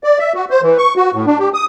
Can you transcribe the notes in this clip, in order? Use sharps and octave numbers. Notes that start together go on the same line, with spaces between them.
D5
E5
F#4
C5
E3
C#6
F#4
A2
D4
G4
D#6